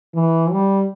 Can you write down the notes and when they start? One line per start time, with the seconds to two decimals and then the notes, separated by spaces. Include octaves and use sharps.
0.14 E3
0.51 G3